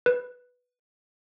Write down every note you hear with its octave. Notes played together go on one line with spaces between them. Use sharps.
B4